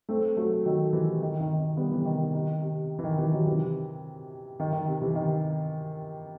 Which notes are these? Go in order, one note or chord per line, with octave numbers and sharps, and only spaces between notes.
A3 C4
F#3 A3
D#3 F#3
C3 E3
D#3
D#3
D#3
G3 B3
C3 E3
D#3
C3
D#3
C3
E3
D#3
C3 E3
D#3 F#3
C3 E3
D#3
D#3
C3
C3 E3
D#3